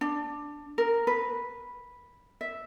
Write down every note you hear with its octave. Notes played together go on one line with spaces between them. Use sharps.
D4
A#4
B4
E5